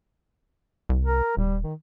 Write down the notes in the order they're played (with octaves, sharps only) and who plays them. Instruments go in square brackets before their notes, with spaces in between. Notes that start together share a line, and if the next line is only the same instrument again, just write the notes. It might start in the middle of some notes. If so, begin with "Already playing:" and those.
[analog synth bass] C2
[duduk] A#4
[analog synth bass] D#1 [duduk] G3
[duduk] D#3